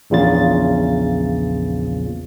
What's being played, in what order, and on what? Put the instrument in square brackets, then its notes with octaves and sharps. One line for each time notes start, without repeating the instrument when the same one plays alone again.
[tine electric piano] A#1 E2 A#2 C#3 F4 A6